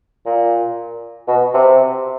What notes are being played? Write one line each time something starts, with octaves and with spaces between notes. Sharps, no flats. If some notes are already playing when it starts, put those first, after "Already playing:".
A#2
B2
C3